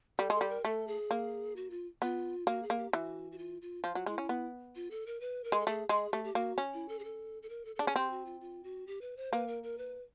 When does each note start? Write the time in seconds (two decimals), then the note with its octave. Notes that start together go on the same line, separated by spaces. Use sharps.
0.18 G3 A4
0.30 G#3 A4
0.41 G3
0.49 A#4
0.64 A3 A4
0.87 G#4
1.11 A#3
1.56 F#4
1.70 F4
2.02 B3 F4
2.47 A#3 F#4
2.63 G#4
2.70 A#3
2.78 G4
2.92 E3 F#4
3.32 F#4
3.38 F4
3.62 F4
3.84 F3 F4
3.95 F#3
4.06 G#3 E4
4.18 C#4
4.29 B3
4.75 F4
4.91 A4
5.06 A#4
5.21 B4
5.44 A#4
5.52 G#3
5.60 A4
5.67 A3 G#4
5.89 G#3 G#4
6.13 A3 G4
6.24 G4
6.35 A#3 F#4
6.58 C#4
6.74 E4
6.89 A4
6.99 G#4
7.04 A4
7.43 A4
7.49 A#4
7.65 A4
7.76 A4
7.79 D4 G#4
7.87 C#4
7.96 C4 G4
8.10 F#4
8.26 F4
8.41 F4
8.64 F#4
8.87 G4
9.01 B4
9.17 C5
9.33 A#3 B4
9.47 A#4
9.63 A#4
9.78 B4